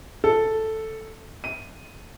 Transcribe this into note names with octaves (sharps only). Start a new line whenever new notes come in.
A4
D#7